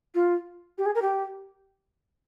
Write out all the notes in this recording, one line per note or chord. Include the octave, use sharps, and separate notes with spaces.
F4
G4
G#4
A#4
G4